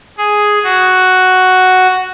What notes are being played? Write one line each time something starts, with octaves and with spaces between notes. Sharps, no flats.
G#4
F#4